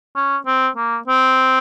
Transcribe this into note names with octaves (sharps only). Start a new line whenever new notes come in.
C#4
C4
A#3
C4